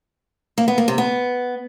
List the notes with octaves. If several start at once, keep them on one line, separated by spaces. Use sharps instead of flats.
A#3
B3
A#3
C3
B3